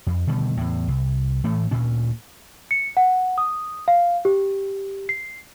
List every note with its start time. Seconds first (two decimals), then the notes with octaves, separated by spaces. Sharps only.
0.07 F2
0.27 B2 D3 D#3 G3
0.57 E2 A2
0.88 C2
1.44 A2 E3 A3
1.71 D2 A#2 C#4
2.71 C#7
2.97 F#5
3.38 D#6
3.88 F5
4.25 G4
5.09 C7